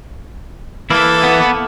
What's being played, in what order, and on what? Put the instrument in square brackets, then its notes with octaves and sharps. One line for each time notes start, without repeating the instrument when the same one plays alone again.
[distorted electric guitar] E3 [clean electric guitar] A#3 E4 [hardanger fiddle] A4
[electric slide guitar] B3